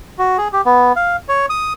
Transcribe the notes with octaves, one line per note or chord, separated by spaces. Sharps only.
F#4
G#4
G4
B3
F5
C#5
D#6